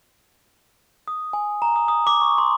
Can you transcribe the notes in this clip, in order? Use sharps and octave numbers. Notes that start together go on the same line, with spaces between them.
D#6
G#5
A#5
D#6
D#6
D6
C#6
C6